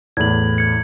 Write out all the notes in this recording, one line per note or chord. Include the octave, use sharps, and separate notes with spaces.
E2 A2 G#6 F#7
G#6 C#7